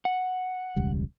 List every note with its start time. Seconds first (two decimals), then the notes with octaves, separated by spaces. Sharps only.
0.05 F#5
0.76 E1 C#2 G3